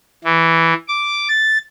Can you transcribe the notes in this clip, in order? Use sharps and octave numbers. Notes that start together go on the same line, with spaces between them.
E3
D6
A6